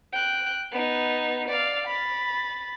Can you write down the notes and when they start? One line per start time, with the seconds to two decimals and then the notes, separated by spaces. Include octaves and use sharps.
0.12 G5 F#6
0.72 B3 D#4
1.48 D5 F5
1.87 B5 A6